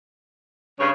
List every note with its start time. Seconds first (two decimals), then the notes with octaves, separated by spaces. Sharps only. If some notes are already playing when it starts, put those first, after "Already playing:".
0.79 G2 C#3 C#5